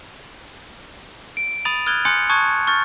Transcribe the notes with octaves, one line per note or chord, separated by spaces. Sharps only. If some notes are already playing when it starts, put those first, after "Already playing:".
D7
B5 D#6 A6 D#7 F7
D#6 F6 F#6 G#6 A6 G7
G#5 C6 D#6 F#6 G6 C#7
A5 C#6 D#6 F#6 G#6
C#6 F6 G6 A6